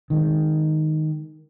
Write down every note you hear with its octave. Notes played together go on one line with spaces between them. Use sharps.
D#3 G#3